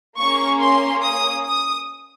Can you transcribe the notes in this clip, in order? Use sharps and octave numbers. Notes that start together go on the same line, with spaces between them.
A#3 C#4 G#4 C#6
C6
D#6
D#6